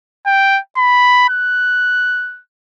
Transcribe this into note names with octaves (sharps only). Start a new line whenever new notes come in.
G5
B5
F#6